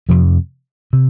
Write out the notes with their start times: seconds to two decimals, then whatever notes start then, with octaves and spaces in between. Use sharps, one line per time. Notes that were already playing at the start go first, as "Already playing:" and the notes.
0.09 F2 C3 F3
0.93 C3